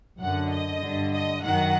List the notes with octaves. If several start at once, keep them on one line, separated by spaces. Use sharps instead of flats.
F#2 D3 F#5
D#5
G2 D3
D#5
F#2 D#3 F#5